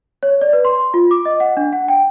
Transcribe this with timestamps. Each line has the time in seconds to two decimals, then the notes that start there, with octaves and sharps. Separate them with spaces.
0.23 C#5
0.41 D5
0.53 B4
0.65 C6
0.94 F4
1.11 D6
1.25 D#5
1.40 F#5
1.57 D4
1.73 F#5
1.88 G5